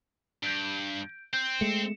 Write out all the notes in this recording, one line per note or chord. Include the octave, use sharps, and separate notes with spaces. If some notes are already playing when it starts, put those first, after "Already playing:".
G2 G6 D7
C4 G6
G#3 A3 C#7 E7